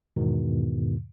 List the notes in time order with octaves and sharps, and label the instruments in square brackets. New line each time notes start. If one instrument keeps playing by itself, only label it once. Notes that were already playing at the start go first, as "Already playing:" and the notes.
[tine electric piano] E2 G#2 B2 D#3